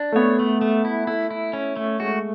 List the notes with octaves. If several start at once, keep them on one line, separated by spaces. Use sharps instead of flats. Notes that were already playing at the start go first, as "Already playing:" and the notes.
Already playing: D4
A3
B3 C#5
A3
A3
E4
A3 E4
E4
C#4
A3
G#3 F#4